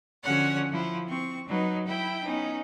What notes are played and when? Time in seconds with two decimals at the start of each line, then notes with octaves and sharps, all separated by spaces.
0.24 D3 F3 C#4 F#4 C#5 F#5
0.71 F3 E4
1.08 C4 C#6
1.47 F#3 D#4 B4
1.86 E4 G5 B5
2.23 B3 C#4 D#4